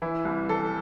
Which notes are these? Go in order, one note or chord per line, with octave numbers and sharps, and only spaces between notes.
E3 E4
C2
E3 A4